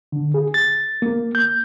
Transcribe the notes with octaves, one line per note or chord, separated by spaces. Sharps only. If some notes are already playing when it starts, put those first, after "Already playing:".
D3
G#4
A6
A#3
G6